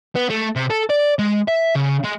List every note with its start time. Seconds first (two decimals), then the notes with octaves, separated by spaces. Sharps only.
0.16 B3
0.30 A3
0.56 C3
0.70 A4
0.90 D5
1.19 G#3
1.48 E5
1.75 C#3
2.04 G#3